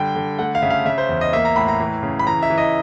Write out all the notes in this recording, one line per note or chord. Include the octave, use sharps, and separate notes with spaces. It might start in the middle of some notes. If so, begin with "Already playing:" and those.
Already playing: D3 G3 G5
D3
A3 F#5
F5
C#3 E5
F5
C#3 E5
C5
E2
D#5
A#3 E5
A#5
A2 B5
A#5
E3
C#3
B5
E3 A#5
E5
E3
D#5